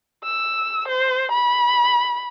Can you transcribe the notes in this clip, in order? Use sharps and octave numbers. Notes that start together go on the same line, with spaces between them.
E6
C5
B5